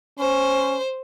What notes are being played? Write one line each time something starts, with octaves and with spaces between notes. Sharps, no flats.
C#4 C5